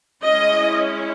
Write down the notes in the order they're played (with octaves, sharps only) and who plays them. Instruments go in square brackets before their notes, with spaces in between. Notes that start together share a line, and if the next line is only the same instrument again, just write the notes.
[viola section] G#3 C#4 E4 D#5